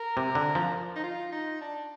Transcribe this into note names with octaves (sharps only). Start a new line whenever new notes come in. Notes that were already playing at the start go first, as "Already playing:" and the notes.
Already playing: A#4
C3
D3
F3
D#4
F4
D#4
D4